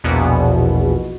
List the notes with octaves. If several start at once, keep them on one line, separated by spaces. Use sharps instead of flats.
A#1 E2 B2